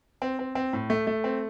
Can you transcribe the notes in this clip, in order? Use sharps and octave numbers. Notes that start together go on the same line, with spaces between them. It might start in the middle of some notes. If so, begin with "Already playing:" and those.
C4
C4
C4
A2
A3
A3
C4